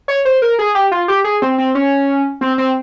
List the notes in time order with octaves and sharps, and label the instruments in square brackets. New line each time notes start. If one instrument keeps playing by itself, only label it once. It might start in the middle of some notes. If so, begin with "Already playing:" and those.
[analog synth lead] C#5
C5
A#4
G#4
G4
F4
G4
G#4
C4
C4
C#4
C4
C4